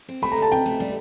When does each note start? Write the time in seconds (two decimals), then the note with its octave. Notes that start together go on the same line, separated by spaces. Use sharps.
0.08 C4
0.22 A3 B5
0.32 A#5
0.38 D2 A5
0.52 C3 G5
0.66 A3
0.80 G3